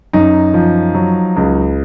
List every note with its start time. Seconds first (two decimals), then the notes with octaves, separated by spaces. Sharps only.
0.13 F#2 D#4
0.54 F3
0.95 F#3
1.36 C#2